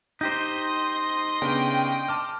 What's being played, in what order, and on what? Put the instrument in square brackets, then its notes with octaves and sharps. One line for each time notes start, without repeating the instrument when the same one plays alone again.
[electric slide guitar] D#4 G4 C5 [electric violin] D#5 C6
[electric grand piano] C#3 B3 D4 [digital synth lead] G5
[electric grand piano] A5 D6 F6